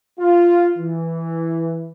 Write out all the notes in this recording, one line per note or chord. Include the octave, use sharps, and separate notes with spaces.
F4
E3